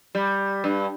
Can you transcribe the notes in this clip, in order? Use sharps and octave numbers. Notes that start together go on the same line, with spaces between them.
G3
G2